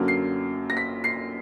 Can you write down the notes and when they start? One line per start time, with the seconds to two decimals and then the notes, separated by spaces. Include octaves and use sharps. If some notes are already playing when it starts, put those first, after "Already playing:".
Already playing: F#2 D3 F#3 A#3
0.08 C7
0.70 A#6
0.77 B6
1.04 C7